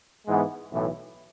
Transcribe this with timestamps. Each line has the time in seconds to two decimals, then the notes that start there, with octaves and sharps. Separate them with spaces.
0.26 G#2 E3 G#3 B3
0.71 B1 A2 E3